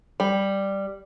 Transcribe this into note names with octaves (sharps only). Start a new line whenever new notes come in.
G3